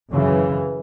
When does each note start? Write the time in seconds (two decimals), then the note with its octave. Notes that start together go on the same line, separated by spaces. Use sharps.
0.11 F#2 C#3 E3